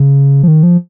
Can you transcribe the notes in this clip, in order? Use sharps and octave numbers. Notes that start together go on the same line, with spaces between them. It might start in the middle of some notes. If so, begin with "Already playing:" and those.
Already playing: C#3
F3
D#3
F3